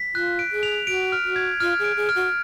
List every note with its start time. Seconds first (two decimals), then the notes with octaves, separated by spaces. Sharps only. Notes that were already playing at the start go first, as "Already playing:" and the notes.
Already playing: B6
0.15 F4 F#6
0.39 D7
0.52 G#4
0.63 F7
0.87 F#4 D7
1.12 F6
1.24 F#4
1.36 G#6
1.60 F4 F6
1.79 G#4 D7
1.96 G#4
2.09 F6
2.16 F#4